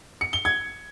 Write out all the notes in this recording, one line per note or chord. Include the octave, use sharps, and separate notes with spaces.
C#7
G7
G#6